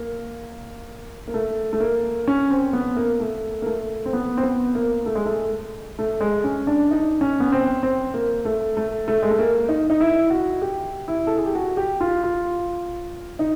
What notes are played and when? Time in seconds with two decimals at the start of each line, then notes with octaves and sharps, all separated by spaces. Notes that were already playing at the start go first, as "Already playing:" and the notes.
Already playing: A#3
1.27 A#3
1.34 A3
1.73 A3
1.80 A#3
2.28 C#4
2.50 C4
2.73 B3
2.96 A#3
3.20 A3
3.62 A#3
3.66 A3
4.06 C4
4.13 B3
4.37 C4
4.43 B3
4.75 A#3
5.06 A3
5.15 G#3
5.26 A3
5.99 A3
6.21 G#3
6.44 C#4
6.67 D4
6.91 D#4
7.21 C#4
7.40 B3
7.52 C4
7.83 C4
8.14 A#3
8.45 A3
8.77 A3
9.08 A3
9.23 G#3
9.31 A3
9.39 A#3
9.69 D#4
9.90 D#4
10.00 E4
10.30 F#4
10.62 G4
11.08 E4
11.27 A4
11.37 G#4
11.46 G4
11.55 F#4
11.77 G4
12.01 F4
12.23 F4
13.39 D#4